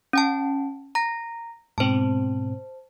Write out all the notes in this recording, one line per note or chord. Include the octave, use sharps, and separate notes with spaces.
C#4 G5 A5
A#5 A#6
G#2 B2 C4 C5 A5